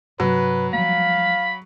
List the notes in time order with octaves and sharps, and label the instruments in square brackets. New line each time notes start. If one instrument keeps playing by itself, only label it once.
[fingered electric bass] G2 C3 C4 [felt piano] F#3 [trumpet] B4
[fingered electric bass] F3 G3 A3 [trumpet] F5 [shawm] B5